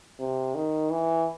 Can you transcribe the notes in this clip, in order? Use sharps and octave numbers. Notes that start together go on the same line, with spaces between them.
C3
D#3
E3